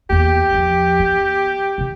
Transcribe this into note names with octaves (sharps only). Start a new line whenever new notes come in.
E2 A#3 G4
E2 F3
B3
C3 E3